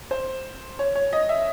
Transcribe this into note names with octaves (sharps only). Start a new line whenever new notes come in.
C5
C#5
C#5
D#5
E5